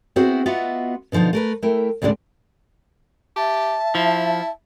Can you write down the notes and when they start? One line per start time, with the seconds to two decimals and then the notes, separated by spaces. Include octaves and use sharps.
0.16 B3 C4 E4 F#4 G#4 C5
0.46 B3 F4 F#4 D#5 E5 F#5
1.12 B2 D3 F3 D#4 F4
1.33 A3 A#4 B4
1.63 A3 E4 A#4 G5
2.02 D2 A2 C#3 G#3 D4
3.36 G4 E5 A5
3.95 F3 E4